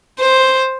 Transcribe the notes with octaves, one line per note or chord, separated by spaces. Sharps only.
C5